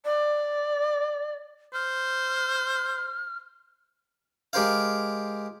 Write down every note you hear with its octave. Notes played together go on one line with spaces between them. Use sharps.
D5
C5 F6
G#3 G4 A#4 C5 F5